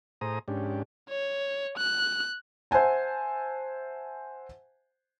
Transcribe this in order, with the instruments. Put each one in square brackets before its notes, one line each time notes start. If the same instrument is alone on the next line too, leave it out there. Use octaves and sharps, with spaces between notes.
[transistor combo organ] A2 G#4 C5 A#5 D#6
G#2 C#4 D4 G4
[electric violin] C#5
F#6
[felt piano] C5 E5 F#5 G#5 A5